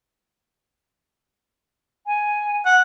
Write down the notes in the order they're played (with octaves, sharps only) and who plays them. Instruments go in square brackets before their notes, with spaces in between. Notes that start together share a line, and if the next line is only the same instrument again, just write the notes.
[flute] G#5
[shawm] F#5